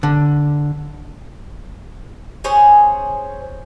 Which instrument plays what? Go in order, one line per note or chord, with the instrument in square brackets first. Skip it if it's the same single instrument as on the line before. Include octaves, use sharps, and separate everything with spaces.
[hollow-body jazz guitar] D3
[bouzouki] C#4 G#4 C5 C#5